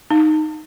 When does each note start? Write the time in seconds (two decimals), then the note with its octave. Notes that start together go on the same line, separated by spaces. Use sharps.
0.11 D#4